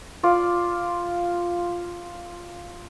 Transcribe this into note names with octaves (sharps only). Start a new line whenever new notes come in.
F4 D5